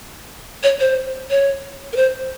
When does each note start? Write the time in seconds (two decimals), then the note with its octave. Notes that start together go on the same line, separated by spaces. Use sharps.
0.63 C#5
0.80 C5
1.30 C#5
1.93 A#4
1.96 C5